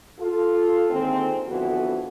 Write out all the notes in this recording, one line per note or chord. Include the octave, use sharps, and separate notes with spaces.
F4 A4
D3 D#3 G#3 A#3 C4
F2 D3 E3 F3 B3 F#4